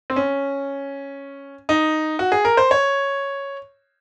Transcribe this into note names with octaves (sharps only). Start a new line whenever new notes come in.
C4
C#4
D#4
F#4
G#4
A#4
C5
C#5